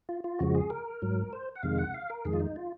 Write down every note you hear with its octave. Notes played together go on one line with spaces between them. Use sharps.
F4
F4
F2 C#3 F3 G#3 F#4
G#4
A#4
G#2 F#3
C5
F#5
F2 C3 D#3 G#3 F5
F#5
F5
A#4
F2 D#3 G#3 G#4
F4
D#4
F4